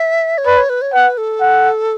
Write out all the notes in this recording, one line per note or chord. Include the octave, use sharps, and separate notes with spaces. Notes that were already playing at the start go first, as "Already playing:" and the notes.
Already playing: E5
C#5
B4 D5
C#5
B4
C#5
B4 F#5
A4
F#5